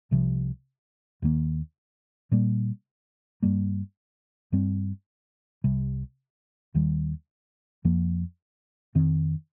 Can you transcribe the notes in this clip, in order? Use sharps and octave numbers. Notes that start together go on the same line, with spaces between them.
C2 C3 F3
D#2 D#3 A#3
A#2 G3 A#3
G2 G3 A#3
G2 G3 C4
C2 C3 G3
D#2 D#3 G3
F2 F3 A#3
F2 D#3 C4